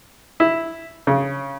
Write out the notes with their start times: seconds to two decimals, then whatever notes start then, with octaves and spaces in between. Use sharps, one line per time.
0.40 E4
1.07 C#3